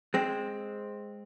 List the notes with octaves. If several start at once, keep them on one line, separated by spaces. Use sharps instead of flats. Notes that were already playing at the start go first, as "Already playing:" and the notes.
G#3 C4